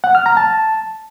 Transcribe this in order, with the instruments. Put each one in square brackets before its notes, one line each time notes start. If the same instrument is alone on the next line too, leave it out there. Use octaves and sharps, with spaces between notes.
[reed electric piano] F#5
F6
A#5
A5